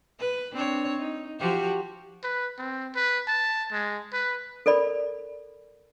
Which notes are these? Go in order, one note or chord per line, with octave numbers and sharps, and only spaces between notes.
B4
C4 D4 C#5
D#4
F3 F#4 G4
B4
C4
B4
A5
G#3
B4
A4 A#4 D5 B5